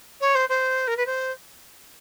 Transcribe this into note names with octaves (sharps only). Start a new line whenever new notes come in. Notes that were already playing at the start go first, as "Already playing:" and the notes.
C#5
C5
C5
A#4
B4
C5